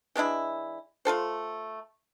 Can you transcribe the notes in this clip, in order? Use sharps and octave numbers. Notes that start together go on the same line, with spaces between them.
E3 G#3 D4 E4
A3 F4 A4 C5